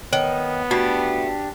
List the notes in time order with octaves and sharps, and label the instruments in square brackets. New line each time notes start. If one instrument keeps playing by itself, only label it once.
[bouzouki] D#3 [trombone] B3 [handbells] C#5
[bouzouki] A3 [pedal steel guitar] D4 G4 [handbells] F#4